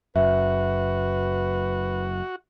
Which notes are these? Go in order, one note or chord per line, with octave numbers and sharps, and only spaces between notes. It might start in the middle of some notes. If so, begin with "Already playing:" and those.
F#1 F#2 F#4 B4 E5